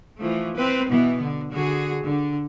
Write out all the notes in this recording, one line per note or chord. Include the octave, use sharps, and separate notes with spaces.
E3 F3 A3
C4 B4
B2 E3 B3
D3
D3 F#4 G#4
D3